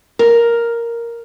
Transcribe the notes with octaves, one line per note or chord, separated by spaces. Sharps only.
A#4